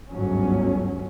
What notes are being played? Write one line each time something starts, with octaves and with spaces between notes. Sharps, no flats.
G1 D2 G#2 F#3 C#4